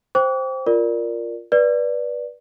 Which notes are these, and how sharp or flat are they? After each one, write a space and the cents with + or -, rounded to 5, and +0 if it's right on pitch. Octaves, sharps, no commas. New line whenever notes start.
C5 +0 G5 +0 D6 -45
F4 +0 A#4 +0 D5 +0
B4 -15 D5 +0